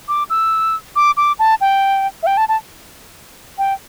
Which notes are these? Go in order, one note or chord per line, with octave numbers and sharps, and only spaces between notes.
D6
E6
D6
D6
A5
G5
E5
G5
A5
A5
G5